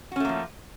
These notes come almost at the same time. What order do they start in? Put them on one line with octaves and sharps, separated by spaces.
F#4 C#4 A3 A#3 F3